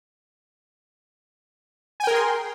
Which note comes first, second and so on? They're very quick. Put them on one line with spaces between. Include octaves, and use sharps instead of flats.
G#5 G5 A#4 G#4 C6